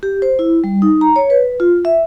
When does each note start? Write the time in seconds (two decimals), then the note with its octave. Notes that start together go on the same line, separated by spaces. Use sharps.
0.03 G4
0.22 C5
0.39 E4
0.64 G3
0.82 D#4
1.01 A#5
1.16 C#5
1.30 B4
1.60 F4
1.85 E5